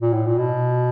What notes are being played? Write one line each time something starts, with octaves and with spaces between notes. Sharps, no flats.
A#2
A2
A#2
B2